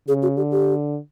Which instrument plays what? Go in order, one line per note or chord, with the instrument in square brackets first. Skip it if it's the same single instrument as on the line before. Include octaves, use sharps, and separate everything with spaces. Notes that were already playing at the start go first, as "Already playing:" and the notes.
[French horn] C#3 [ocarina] G#4
[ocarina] F#4
[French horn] D3 [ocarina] G4
[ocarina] G4